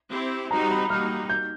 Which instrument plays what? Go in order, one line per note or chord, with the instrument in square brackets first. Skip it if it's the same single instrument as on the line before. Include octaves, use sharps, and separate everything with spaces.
[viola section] C4 E4 G4
[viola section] G3 C4 D#4 F#4 [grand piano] A#5
[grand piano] B5
[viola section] G3 A#3 D#4 F#4 [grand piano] F6
[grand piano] G6